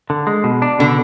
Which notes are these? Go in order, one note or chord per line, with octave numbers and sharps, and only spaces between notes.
D3
G#3
B2
D4
B2 D3